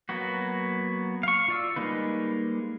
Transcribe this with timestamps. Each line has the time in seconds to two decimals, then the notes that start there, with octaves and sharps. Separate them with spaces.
0.09 F#3 A#3 B3 F#4
1.23 F5 C#6
1.48 F4 D5 E6
1.76 G3 G#3 A#3 D#4 B4